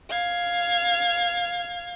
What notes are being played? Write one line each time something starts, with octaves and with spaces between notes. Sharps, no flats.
F5 G#6